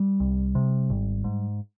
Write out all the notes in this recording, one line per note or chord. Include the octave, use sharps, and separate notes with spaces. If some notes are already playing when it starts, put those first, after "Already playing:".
Already playing: G3
C2
C3
G#1
G#2